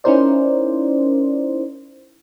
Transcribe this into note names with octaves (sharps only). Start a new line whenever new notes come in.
C#4 D#4 E4 A#4 C5 D5